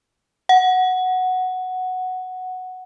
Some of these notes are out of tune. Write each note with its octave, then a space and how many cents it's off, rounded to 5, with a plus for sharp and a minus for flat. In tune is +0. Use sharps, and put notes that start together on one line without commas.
F#5 +0